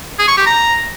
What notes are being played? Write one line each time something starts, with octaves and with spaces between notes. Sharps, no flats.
G#4
C#6
G4
A#5